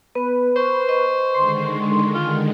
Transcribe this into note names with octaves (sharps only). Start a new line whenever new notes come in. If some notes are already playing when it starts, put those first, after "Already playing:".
B3 B4
C5 C#6
D#5 C#6
D3 D#3 G#3 C6
F4